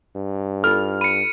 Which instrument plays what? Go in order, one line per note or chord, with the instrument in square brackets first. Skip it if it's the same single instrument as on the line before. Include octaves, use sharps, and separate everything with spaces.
[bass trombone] G2
[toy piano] D#4 F4 A4 [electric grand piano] F6
[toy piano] B5 [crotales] C#7 D#7